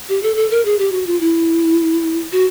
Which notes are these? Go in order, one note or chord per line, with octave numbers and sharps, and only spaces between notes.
G4
A4
A4
A#4
G#4
G4
F#4
F4
E4
F#4